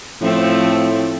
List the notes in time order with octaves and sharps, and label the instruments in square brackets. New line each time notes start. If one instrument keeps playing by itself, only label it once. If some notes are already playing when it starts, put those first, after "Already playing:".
[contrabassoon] A2 [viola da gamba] F3 A3 C4